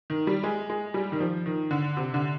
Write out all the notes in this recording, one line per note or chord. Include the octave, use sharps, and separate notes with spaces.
D#3
G3
G#3
G#3
G3
D#3
F3
D#3
D3
C3
D3